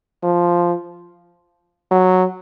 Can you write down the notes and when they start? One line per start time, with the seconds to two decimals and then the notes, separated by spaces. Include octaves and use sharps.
0.23 F3
1.91 F#3